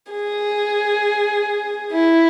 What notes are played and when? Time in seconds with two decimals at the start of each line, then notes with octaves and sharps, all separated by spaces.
0.12 G#4
1.91 E4